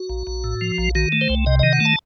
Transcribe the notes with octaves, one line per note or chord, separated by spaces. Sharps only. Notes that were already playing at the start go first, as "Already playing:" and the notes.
Already playing: F#4
A#1
A#1
A2
F3
A#1
D#3 F#4
A3
C5
C2
C3 D#5
D#3 D#5
F#5
A3 A5